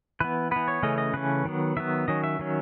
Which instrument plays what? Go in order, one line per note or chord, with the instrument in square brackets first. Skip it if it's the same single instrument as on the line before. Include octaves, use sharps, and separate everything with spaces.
[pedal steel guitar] E3 B3 B4
E3 B3 B4
C#5
C#3 E3 A3 C#4 D#5
D#5
C#3 E3 A3 C#4 B4
D#3 F#3 B3
D#3 F#3 B3 E5
D#3 F#3 C#4 D#5
E5
D#3 F#3 C#4